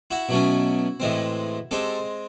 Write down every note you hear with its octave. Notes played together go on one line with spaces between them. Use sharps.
E4 F#4
B2 F#3 A3 C#4
A2 E3 G#3 C4
G#3 C4 G4 A4